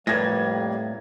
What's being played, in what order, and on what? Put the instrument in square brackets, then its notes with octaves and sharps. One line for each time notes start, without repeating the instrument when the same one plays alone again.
[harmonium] F2 G3 A#3 [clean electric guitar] A2 [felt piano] B4 G#6 A#6